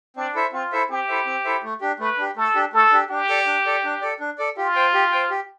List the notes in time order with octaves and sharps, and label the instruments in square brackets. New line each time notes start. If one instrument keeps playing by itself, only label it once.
[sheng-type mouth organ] C4 [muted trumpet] D4
[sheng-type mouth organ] E4 A4 C5 E5
[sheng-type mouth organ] C4 [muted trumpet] F4
[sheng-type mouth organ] E4 A4 C5 E5
[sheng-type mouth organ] C4 [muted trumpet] G4
[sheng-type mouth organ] E4 A4 C5 E5
C4
E4 A4 C5 E5
A3
D4 G4
[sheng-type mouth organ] A3 [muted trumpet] B4
[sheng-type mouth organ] D4 G4
[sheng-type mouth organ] A3 [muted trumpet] A4
[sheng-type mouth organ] D4 G4
[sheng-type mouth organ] A3 [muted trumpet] A4
[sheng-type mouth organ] D4 G4
[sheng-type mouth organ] D4 [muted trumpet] G4
[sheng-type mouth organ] A4 D5
D4
A4 D5
D4
A4 D5
D4
A4 D5
[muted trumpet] F4 [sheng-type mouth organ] G4
[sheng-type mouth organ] C5 G5
G4
C5 G5
G4